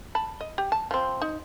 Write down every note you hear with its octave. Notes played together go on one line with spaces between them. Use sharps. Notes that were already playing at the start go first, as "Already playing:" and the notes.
A5 B5
D#5
G4
A5
F3 C4
D#4